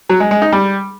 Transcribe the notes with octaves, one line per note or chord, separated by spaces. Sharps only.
F#3
G#3
G#3
D#4
G3